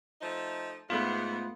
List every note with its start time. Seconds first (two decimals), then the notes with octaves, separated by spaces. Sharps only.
0.21 F3 A3 D#4
0.90 G#2 A3 B3 F4